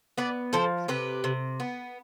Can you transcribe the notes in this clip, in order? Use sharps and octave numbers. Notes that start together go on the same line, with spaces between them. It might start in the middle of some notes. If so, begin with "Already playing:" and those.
B3 B4 D5
F3 A4 C5
C3 G4 B4
C3
B3